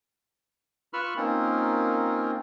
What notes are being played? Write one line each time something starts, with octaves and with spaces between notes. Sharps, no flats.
F4 B4 B5 C#6 E6 F6
A#3 C4 C#4 D#4 F4 A#4